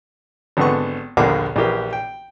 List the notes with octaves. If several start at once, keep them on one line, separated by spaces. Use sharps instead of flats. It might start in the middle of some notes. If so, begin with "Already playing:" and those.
G#1 D3 B3 F#5 C#6
A#1 D#2 D3 A#3 F#5 D6
A#1 E3 G4 A#4
G5